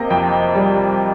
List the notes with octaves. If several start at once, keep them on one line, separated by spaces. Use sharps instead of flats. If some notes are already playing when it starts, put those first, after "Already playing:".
Already playing: C3 A#3 D#5
F2 G5
G3